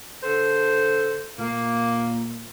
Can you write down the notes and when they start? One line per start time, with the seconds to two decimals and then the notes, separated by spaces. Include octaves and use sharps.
0.23 D3 A4 C5
1.39 A#2 A#3